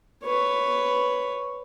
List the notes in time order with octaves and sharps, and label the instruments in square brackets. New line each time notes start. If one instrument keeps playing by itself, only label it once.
[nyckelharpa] B4 C#5